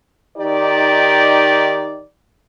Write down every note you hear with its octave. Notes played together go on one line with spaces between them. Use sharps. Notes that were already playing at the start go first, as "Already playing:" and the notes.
D#3 D#4 G4 D5